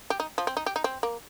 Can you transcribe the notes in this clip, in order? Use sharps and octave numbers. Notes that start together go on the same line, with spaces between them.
G4
D#4
F3
C4
D#4
G4
D#4
C4
A#3